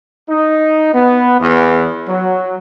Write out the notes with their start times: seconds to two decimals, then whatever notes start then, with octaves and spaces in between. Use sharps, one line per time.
0.30 D#4
0.94 B3
1.41 E2
2.08 F#3